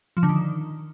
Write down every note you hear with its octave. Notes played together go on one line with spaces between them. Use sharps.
F3
D3
D#3